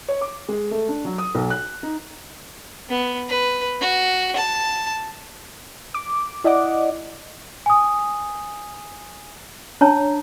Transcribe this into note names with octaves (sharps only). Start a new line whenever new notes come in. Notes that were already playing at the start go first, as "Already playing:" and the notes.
C#5
D6
G#3
A3
D4
F#3
D#6
B1
F#6
D#4
B3
B4
F#4
A5
D6
E4 D5 D#5 F#5 D6
G#5 D#6
D4 C#5 A5 A#5